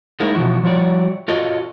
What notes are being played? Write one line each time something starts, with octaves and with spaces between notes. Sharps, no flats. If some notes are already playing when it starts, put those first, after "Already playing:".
G#3 A#3 D#4 E4
B2 E3 F3 F#4
F3 G3 E4 F#4 C#5 D5
F4 F#4 A4 D#5